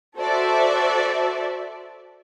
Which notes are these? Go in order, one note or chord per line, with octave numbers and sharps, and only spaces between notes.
F#4 A4 C5 D5 E5